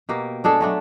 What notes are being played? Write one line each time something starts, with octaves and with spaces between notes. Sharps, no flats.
B2 A#3 G4
G#3 D4 G#4 A4
F#3 A3 D4